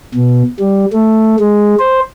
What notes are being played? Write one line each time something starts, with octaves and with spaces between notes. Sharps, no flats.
B2
G3
A3
G#3
C5